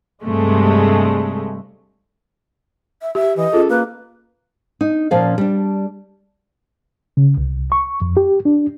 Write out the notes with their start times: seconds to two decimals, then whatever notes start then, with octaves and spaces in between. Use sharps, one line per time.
0.23 G2 C3 G#3 A3
3.02 E5
3.15 G4 E5
3.37 E3 D#5
3.53 C#4 F4 G#4 A4
3.70 A#3 B4
4.81 D#4
5.11 A#2 F3 C#4 D5 F5
5.38 G3 D4
7.17 C#3
7.37 C2
7.72 C#6
8.02 F2
8.17 G4
8.45 D4